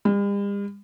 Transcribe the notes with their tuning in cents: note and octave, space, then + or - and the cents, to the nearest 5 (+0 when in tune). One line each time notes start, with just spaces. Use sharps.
G3 +45